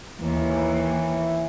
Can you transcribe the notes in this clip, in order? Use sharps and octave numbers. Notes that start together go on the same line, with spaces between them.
D#2 E3